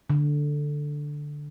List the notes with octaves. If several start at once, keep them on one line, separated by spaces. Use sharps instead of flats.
D3